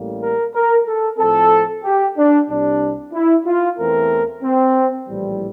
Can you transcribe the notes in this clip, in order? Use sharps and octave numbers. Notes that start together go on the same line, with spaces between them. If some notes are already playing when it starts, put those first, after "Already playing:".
Already playing: A1 A2 G3 A#3
A#4
A#4
A4
A2 F3 C4 A4
G4
D4
C2 C3 G3 D4
E4
F4
E2 E3 A3 C4 A#4
C4
A#1 A2 E3 G3